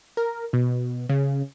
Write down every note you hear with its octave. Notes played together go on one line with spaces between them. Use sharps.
A#4
B2
C#3